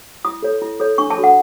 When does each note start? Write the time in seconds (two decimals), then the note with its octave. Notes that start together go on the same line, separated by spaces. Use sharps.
0.25 E4 D#6
0.43 A4 C#5
0.62 E4
0.80 A4 C#5
0.98 D4 C#6
1.10 A5
1.17 F#4 A4 C#5
1.24 F#5